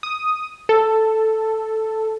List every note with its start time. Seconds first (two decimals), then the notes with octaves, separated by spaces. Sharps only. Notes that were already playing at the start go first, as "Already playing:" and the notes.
0.03 D#6
0.69 A4